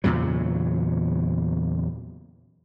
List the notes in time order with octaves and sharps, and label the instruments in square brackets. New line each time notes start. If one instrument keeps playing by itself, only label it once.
[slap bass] E2 A#2 C#3 F#3